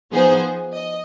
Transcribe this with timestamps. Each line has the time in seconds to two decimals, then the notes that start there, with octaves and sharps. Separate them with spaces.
0.13 F3 B3 D#4 G#4 C5
0.73 D#5